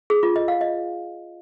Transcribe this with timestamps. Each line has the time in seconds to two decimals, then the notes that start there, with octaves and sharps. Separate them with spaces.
0.10 G#4
0.23 F4
0.36 D#5
0.48 F5
0.61 D#5